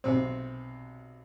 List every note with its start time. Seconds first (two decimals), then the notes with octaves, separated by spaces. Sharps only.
0.04 B1 C3 C4